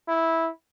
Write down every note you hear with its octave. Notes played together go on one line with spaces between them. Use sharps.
E4